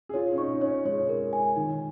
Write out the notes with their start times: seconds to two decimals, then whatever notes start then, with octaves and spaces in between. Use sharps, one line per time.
0.09 G#4
0.14 F4 C#5
0.32 C#4
0.38 D#4 C#6
0.54 D#4
0.61 C#4 C#5
0.85 G#3 C#5
1.09 A#4
1.33 G#5
1.56 D#3 D#4